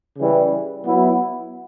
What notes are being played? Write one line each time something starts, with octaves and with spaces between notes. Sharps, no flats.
C#3 E3 G3
F#3 B3 E4